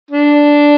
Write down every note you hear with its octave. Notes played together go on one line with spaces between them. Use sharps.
D4